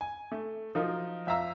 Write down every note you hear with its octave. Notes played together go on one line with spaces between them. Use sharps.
G#5
A3
F3 F#3 D#4 F4 A#4
F2 E5 F5 A#5 E6